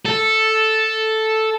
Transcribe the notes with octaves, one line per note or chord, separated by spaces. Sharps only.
A4